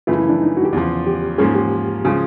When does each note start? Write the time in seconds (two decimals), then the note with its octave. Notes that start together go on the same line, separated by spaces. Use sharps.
0.07 F#2 C#3 E3 A3 F4
0.19 E4
0.30 D4
0.41 D#4
0.57 F#4
0.65 G4
0.73 E2 C#3 F3
1.06 G4
1.38 G#2 F3 A#3 C#4 G#4
1.55 G4
2.05 C#3 F3 G#3 F#4